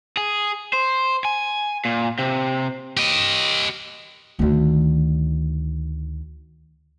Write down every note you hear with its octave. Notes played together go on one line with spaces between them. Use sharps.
G#4
C5
G#5
A#2
C3
G4 D#5
D2 D#3